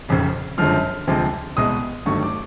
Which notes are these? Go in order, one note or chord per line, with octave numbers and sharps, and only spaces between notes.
F1 F2 C#3
G1 F#2 D3 F3 G#3 F6
D2 C3 F3 G#3
C2 B2 G#3 D#6
G1 G2 D#3 F#3 A3 C#6
D6